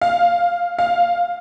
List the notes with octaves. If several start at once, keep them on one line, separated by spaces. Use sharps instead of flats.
F5
F5